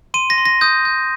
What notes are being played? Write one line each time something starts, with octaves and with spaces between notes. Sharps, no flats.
C6 D#7
A#6
C6
A#6
D#6 G6
G6